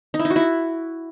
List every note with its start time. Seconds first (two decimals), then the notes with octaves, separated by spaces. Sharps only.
0.14 D#4
0.19 E4
0.25 D#4
0.30 F#4
0.36 E4